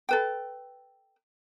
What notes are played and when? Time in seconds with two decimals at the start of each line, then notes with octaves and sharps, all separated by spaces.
0.09 A4 B4 G5